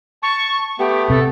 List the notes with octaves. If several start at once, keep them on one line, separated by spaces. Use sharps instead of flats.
A5 C#6
A3 B3 G4
C3 A4